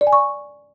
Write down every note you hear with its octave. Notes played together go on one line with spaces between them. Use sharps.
D5
G#5
C#6